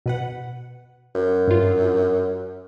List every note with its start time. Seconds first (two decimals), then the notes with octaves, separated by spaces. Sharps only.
0.06 B2 B4 F#5
1.15 F#2
1.47 G2 F4